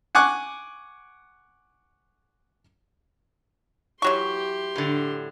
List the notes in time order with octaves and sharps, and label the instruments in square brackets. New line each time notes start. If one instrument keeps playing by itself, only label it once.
[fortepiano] F#5 G#5 C#6 D6 F#6
[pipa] E3 F#3 C#6 [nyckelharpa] G4 C6
[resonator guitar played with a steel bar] A2 D3